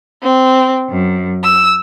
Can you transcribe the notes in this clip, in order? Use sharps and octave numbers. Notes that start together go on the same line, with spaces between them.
C4
F#2
E6